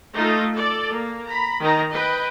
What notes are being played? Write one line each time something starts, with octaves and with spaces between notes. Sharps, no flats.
A3 D#4 F4 A4
A4 D5
A#3
A#5 B5
D#3 D#4 A#5
B4 D#5 G5